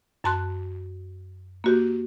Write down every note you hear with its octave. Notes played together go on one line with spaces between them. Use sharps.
F#2 F#4 A5 C6 F#6
A#3 F#4 G4